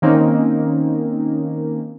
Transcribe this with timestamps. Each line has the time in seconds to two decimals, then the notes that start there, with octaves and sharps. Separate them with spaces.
0.02 D#3 A#3 C4 C#4 D#4